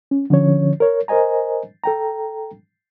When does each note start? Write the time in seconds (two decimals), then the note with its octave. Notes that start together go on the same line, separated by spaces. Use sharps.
0.11 C#4
0.30 D3 F3 C#4 C#5
0.80 A#4 C#5
1.08 A#4 C5 D#5 G#5 A#5
1.84 A4 G5 A#5